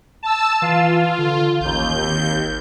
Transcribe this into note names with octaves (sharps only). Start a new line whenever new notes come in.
A5 E6
E3 F4
D3
A1 D#2 G6
G#1